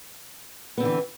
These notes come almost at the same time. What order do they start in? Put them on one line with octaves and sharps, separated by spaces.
B3 C4 D3 E3